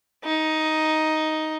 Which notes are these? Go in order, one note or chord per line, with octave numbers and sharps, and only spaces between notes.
D#4